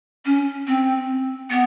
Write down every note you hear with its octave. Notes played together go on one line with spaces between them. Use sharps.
C#4
C4
B3